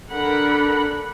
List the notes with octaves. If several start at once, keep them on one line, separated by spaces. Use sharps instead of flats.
D3 D4 A#4 F#5 B5